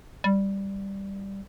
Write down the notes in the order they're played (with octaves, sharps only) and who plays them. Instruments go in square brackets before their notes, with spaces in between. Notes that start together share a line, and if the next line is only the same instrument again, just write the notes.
[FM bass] G3